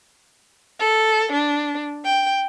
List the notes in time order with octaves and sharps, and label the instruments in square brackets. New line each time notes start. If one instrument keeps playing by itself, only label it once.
[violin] A4
D4
G5